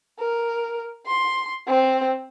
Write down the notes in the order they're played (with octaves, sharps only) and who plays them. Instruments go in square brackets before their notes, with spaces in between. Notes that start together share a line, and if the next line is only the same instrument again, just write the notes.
[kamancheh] A#4
C6
C4